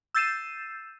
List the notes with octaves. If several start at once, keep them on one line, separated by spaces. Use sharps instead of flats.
E6 G6 A6 C7 D#7 E7